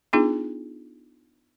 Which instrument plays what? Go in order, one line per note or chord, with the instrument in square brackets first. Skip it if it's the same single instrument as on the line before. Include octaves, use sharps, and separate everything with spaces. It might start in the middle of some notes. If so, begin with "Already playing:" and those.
[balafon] B3 D4 D#4 F4 G#4